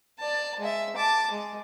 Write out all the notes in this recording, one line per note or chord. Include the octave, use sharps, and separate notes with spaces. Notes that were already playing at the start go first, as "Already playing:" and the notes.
D5 A5
G#3 E5
A5 D6
G#3